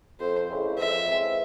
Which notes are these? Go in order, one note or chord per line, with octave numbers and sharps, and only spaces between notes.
F2 C5
C#3 E3 G#3 C4
F2 E5
C#3 E3 G#3 C4